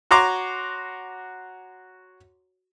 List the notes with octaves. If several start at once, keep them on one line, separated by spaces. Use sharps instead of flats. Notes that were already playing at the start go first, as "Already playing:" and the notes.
F#4 C#5 A#5 C6 D6